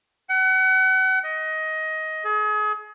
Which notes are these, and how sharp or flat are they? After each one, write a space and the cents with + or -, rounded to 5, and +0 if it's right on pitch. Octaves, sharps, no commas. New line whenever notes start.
F#5 +35
D#5 +15
G#4 +35